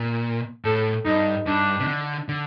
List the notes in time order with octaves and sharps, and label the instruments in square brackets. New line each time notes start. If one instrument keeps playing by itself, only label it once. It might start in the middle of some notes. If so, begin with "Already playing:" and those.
Already playing: [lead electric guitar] A#2
[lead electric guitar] A2 [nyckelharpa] A4
[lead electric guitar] G2 [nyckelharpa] D#4
[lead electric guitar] G2 [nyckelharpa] D4
[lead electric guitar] C3
D3
D3